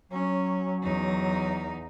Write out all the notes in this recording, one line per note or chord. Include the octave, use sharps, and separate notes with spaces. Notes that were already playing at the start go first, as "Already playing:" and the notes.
F#3 C#4
E2 D#4